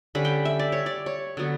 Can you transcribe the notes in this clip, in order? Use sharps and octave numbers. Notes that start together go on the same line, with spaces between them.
D3 G3 C#4 B5
G5
E5
D5
C#5
D5
C#5
D3 F#3 B3